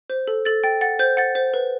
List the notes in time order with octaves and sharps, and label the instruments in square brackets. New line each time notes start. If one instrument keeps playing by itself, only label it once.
[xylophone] C5
A4
A4 A6
G5 A6
F#5 A6
C5 G6
F#5 A6
C5
B4